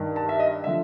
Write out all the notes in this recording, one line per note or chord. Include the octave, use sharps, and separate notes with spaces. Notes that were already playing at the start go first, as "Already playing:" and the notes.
Already playing: G2 D#3
A5
E5
D#5
D3 F3 E5